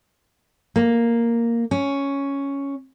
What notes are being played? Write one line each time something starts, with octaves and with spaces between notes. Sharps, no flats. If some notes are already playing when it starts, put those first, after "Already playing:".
A#3
C#4